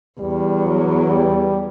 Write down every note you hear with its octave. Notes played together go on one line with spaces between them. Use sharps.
E2 G3
F#3
G3